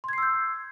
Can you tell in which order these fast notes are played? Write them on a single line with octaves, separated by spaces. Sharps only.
C6 G#6 C7 E6 G6